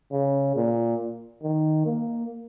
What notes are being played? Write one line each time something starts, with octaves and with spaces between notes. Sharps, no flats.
C#3
A#2
D#3
A#3